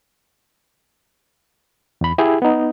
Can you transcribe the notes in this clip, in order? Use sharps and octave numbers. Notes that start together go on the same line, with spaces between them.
E2 B5
E4 G4 G#4
B3 D#4